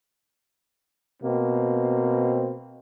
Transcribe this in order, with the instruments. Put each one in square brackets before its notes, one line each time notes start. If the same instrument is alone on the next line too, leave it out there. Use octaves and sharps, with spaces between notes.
[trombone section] B2 A#3 C4